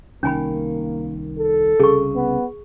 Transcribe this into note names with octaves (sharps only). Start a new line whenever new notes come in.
C2 D#3 A#3 C#4 G#5 B5
A4
C2 C#3 G#4 C#6
B3